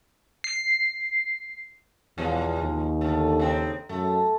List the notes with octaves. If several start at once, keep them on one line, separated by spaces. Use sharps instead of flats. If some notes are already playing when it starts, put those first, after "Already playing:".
C7
E2 B2 F3 G#3
D#2
D3 A3
C#3 C4 D#4
F#2 A3